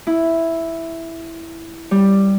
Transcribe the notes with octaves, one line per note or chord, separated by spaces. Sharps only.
E4
G3